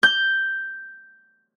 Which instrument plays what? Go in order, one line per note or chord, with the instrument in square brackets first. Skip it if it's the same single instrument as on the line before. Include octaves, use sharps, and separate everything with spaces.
[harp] G6